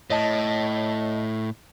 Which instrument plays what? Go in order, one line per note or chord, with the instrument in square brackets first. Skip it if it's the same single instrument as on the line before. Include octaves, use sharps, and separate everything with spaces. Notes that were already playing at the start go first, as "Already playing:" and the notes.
[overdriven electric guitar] A2 [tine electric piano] C#5 D#5 A5